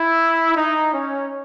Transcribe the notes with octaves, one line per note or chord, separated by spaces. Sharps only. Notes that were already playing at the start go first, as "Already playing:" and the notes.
Already playing: E4
D#4
C#4